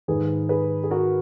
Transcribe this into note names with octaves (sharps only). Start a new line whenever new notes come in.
G#2 D#3 G#4 B4
G#4 B4
G#4
F#4 A#4